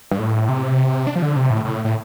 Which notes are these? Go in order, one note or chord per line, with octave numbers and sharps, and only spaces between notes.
G2
A2
C3
D4
F3
D3
C3
A2
A2
A2